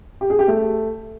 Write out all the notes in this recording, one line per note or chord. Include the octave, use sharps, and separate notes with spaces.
G4
G#4
G4
A3